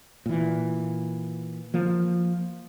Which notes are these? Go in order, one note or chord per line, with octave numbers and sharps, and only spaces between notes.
A#2 E3
F3 A#3